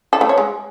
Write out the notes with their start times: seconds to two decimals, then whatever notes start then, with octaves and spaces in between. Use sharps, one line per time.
0.13 A4
0.21 A3
0.29 C#5
0.38 G#3